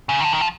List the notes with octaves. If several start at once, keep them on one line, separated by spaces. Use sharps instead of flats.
C#3
D#3
D3
D#3
F3